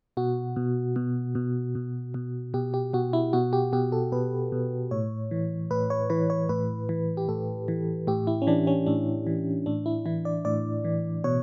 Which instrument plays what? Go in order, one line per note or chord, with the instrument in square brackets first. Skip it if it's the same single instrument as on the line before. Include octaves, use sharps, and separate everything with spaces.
[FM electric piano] B2 F#4
B2
B2
B2
B2
B2
B2 G4
G4
B2 F#4
E4
B2 F#4
G4
B2 G4
A4
B2 B4
B2
A2 C#5
E3
A2 B4
C#5
E3 B4
C#5
A2 B4
E3
G4
A2 A4
E3
A2 G4
E4
C#4
E3 D4
C#4
A2 D4
E3
A2 D4
E4
E3 E4
D5
A2 D5
E3
B2 C#5